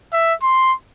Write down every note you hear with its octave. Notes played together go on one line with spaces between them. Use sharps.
E5
C6